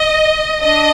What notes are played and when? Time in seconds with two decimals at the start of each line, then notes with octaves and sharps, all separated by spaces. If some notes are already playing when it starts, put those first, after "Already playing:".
Already playing: D#5
0.62 D4 D#5